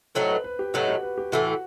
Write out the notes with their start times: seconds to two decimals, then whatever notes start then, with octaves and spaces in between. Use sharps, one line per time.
0.15 A2 F#3 A3 D#4 C5
0.29 B4
0.44 B4
0.59 G4
0.74 A2 F#3 A3 D#4 F#4
0.88 G4
1.03 B4
1.18 G4
1.32 A2 E3 A3 F#4